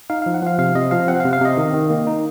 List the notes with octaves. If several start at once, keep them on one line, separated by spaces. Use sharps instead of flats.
D#4 F5
F3 F5
F#5
F3 F5
C3 F5
C3 D#5
F3 F5
C4 F#5
F5
C3
F5
C3 D#5
D#3
D#3
A#3
D#4